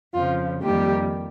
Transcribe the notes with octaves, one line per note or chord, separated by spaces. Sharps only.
F2 C#3 F3 F4
F2 D#3 G3 A#3 G4